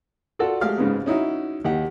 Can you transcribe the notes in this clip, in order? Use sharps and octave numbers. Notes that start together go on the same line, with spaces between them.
F4 F#4 A4 D5 F#5
G#3 A3 G4 F5 F6
G#2 C#3 G#3 B3
C#4 D#4 E4 F#4
D#2 G4 F#5